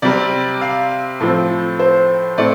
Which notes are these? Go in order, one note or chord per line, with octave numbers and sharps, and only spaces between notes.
C3 G3 C4 D5
F5
A2 F3 C4 A4
C5
A2 A3 C4 D5